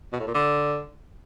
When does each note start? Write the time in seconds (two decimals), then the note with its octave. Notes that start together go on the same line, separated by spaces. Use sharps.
0.13 B2
0.20 A2
0.27 A#2
0.34 D3